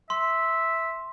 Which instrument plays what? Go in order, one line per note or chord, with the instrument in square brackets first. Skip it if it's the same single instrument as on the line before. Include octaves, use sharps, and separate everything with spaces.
[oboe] E5 [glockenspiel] C6